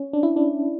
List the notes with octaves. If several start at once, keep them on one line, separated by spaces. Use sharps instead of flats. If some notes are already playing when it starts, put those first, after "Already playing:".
Already playing: C#4
D4
E4
D4